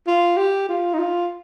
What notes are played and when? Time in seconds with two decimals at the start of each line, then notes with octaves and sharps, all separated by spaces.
0.07 F4
0.37 G4
0.69 F4
0.94 D#4
0.99 F4